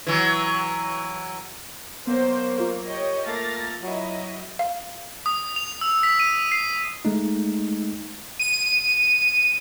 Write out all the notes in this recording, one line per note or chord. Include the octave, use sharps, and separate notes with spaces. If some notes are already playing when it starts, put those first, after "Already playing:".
E3 F#3
F#3 A#3 B3 C5
F4 A#4
G4 C#5 D#5
A3 A#3 F6 A6 A#6
F#3 E4 D#5
F5
D#6
F7
E6
B6
D#7
C7
G#3 A3 D#4
D#7